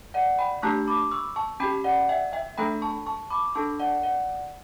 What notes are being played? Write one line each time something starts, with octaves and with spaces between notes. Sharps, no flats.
D5 F#5
G5 B5
A3 D4 G4 A5 C#6
B5 D6
C#6 E6
A5 C#6
C#4 G4 G5 B5
D5 F#5
E5 G5
E5 G5
A3 D4 A4 G5 B5
A5 C#6
A5 C#6
B5 D6
D4 A4 A5 C#6
D5 F#5
D5 F#5